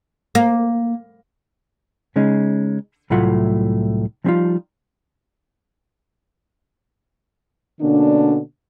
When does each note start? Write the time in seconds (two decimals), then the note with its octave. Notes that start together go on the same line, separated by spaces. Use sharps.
0.35 A#3
2.16 C#3 G#3 C#4 D#4
3.10 C2 A2 F#3 A3 F4 F#5
4.24 F3 G3 C4 D4 D#4 F4
7.81 B2 D3 A#3 C#4 D4